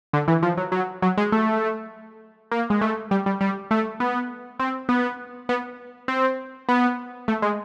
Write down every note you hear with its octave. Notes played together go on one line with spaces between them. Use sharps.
D3
E3
F3
F#3
F#3
F#3
G#3
A3
A#3
G#3
A3
G3
G3
G3
A3
B3
C4
B3
B3
C4
B3
A3
G#3